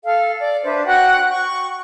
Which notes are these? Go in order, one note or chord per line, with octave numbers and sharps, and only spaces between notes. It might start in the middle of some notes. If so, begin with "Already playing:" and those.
A4 F5
D5
D4 B4 C5 E5
F#4 F#5 G5 F#6
C#6